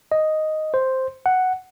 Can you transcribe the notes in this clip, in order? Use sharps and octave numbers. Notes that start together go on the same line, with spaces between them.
D#5
C5
F#5